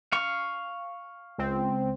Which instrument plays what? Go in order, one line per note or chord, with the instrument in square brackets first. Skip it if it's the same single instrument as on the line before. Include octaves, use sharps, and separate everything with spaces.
[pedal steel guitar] F5 C#6
[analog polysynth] C#2 C4